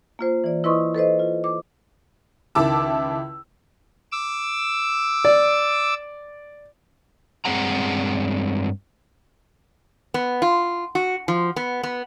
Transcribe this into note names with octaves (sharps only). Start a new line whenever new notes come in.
A#3 F4 C5
E3 D5
E4 B4 D#5 C6 C#6 D#6
A4 B4 C5 D#5
F4
D6
C#2 D#3 E4 A5 D6 E6
D6 E6
D5
G2 G#3 C4 G#4 F#5 A#5
B3
F4
F#4
F3
B3
B3